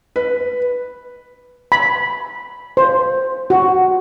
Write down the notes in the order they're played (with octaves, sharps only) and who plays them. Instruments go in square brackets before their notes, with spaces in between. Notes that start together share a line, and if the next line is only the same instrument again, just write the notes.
[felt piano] B4
[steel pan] B5
C5
F#4